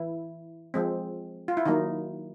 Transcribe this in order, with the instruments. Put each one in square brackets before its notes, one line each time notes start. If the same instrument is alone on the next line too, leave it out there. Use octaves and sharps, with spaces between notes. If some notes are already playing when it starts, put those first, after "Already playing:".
Already playing: [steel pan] E3 E4
F3 G#3 C4
F4
E4
D#3 F#3 A#3 D#4